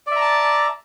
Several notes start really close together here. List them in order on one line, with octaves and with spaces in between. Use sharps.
D5 E5 A#5 A5